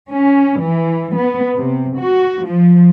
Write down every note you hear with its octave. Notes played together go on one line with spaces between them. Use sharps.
C#4
E3
B3
C3
F#4
F3